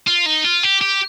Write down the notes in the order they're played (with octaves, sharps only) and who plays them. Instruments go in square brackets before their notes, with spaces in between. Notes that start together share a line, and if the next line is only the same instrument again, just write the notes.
[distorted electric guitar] F4
D#4
F4
G4
G4